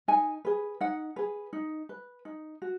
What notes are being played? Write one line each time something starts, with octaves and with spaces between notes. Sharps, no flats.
D#4 G#5
G#4 B4
D#4 F#5
G#4 B4
D#4
B4
D#4
F#4